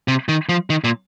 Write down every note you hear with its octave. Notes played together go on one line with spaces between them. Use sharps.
C3
D#3
F3
D#3
A#2